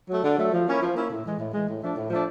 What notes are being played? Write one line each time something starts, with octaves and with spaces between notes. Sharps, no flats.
F#3 A3
D3
F#3 A3
F3
A#3 C#4 E4
F3
A#3 C#4 E4
A2
E3 G#3
A2
E3 G#3
A2
F3 A3 D4
A2
F3 A3 D4